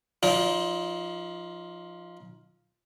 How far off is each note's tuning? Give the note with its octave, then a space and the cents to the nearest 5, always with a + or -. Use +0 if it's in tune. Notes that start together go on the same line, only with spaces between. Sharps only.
F3 +0 D#4 +30 D5 -20